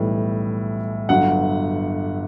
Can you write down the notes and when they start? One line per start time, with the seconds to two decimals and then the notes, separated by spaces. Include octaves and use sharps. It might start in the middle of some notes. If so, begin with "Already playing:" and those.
Already playing: B1 A2 E3 G3
1.09 G1 G2 F#3 F#5